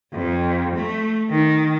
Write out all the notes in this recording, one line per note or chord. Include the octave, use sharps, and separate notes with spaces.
F2
A3
D#3